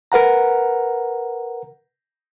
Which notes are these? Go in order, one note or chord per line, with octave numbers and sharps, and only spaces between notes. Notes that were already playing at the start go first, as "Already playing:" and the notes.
A#4 B4 F#5 A#5